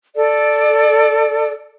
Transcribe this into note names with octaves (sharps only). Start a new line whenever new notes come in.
A4 D5